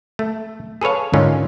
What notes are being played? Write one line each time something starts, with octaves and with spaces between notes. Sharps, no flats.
A3
G#4 A4 B4 C#5 F5
G#2 D3 D#3 C#4 F4